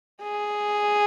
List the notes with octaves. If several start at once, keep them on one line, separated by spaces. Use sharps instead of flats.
G#4